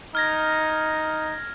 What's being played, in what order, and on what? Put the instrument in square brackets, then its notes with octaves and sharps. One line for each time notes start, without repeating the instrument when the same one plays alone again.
[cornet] D#4 [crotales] F6 G#6 A#6